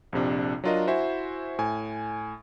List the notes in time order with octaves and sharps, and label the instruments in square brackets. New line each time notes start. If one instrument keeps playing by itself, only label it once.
[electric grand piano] A#1 F2 C3 D4
F#3 D4 F4 A#4 D#5
E4 F#4 C5 E5 G#5
A2 G#5